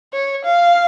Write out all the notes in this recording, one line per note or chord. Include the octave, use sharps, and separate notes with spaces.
C#5
F5